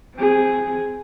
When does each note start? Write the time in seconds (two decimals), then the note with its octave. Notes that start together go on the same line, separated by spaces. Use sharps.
0.15 C4 G#4